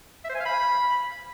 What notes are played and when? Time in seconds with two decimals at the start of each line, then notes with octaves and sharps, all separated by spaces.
0.24 E5
0.30 C5
0.35 G#5
0.40 F5
0.45 B5